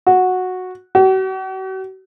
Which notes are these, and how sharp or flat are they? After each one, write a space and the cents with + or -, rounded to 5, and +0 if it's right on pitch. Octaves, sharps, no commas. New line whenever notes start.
F#4 -10
F#4 +40